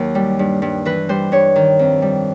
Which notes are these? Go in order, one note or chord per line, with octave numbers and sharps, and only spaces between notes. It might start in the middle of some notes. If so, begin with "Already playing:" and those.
Already playing: D#2 D#3 F#3 A#4
G3
G2
G2
E3 B4
G3 C5
G2 C#5
D#3
F2
G3